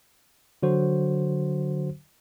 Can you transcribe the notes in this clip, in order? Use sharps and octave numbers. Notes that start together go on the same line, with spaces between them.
D3 F#3 F#4 C5